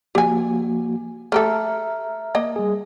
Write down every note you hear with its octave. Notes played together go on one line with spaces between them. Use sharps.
F3 A#3 F#4 G4 G#5
A3 G4 A4 E5 A#5 F6
A#3 D#5
G3 G#4